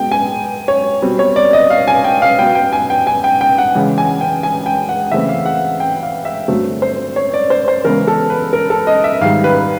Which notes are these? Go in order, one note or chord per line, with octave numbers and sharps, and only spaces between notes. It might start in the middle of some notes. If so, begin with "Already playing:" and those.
Already playing: B2 G#3 B3 G5
G#5
C#5
B2 G3 C4
C#5
D5
D#5
F5
G#5
G5
F5
B2 F#3 B3 G5
G5
G#5
G5
G#5
G5
G5
F#5
C#3 E3 G#3
G#5
G5
G#5
G5
F#5
C#3 E3 A3 C4 E5
F5
F#5
G5
F5
E5
G2 D3 F#3 A3 C4
C5
C#5
D5
C5
C5
C#3 E3 G#3 B3 A#4
A4
B4
A#4
A4
D#5
E5
G#2 D#3 G3 F5
B4